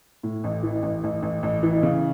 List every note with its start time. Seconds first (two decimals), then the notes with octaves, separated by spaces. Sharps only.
0.23 A2
0.44 A1
0.63 E3
0.83 A1
1.04 A1
1.23 A1
1.43 A1
1.63 E3
1.83 C#3